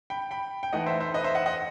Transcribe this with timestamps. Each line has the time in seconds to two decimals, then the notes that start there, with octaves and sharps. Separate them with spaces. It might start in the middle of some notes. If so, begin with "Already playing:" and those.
0.10 G5 B5
0.31 G5 B5
0.63 G5
0.73 E3 A3 D#4 D#5 F#5
0.86 C5 E5
1.00 C5 E5
1.14 B4 D#5
1.24 C5 E5
1.35 D#5 F#5
1.46 D#5 F#5